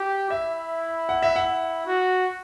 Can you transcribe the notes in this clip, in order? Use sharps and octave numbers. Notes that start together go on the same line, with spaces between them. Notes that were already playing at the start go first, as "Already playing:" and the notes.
Already playing: G4
E4 E5
F#5
E5
F#5
F#4